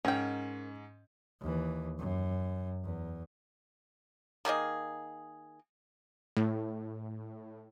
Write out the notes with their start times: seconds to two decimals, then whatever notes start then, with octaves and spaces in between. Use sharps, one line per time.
0.05 G#2 C#4 A#4 G5
1.41 D#2 E3
1.99 F#2
2.84 E2
4.45 D#3 A#3 G#4 D#5
6.37 A2